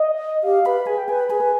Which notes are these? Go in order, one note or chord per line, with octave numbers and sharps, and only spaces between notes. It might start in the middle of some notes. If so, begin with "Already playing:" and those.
Already playing: D#5
G4 F5
B4 B5
G#4 G#5
G5
B4 G#5
B5
G#4 G#5
B4